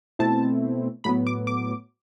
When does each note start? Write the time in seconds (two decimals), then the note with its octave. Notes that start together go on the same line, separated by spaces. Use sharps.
0.19 B2 A3 C4 E4 A5
1.04 A2 F#3 B3 B5
1.27 D6
1.47 D6